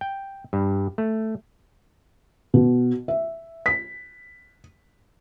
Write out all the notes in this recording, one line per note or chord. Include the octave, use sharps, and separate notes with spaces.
G5
G2
A3
B2
E5
B6